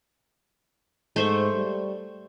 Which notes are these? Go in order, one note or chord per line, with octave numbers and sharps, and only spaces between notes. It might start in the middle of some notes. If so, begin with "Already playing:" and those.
G#2 A3 C5 C#6
G3